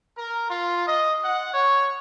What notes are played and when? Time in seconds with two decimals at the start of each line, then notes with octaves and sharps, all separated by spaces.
0.18 A#4
0.50 F4
0.87 D#5
1.24 F#5
1.54 C#5